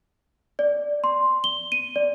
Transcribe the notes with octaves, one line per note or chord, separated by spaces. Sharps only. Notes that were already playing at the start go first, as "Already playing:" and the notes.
D5
C6
G7
D#7
D5